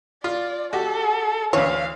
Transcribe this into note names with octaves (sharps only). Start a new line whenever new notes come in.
F4 D5
F#4 G4 A4
D2 E3 C#5 F5